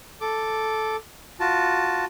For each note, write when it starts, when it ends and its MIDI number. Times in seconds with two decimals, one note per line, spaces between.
0.21 0.96 69
0.21 0.96 86
1.40 2.05 65
1.40 2.05 66
1.40 2.05 81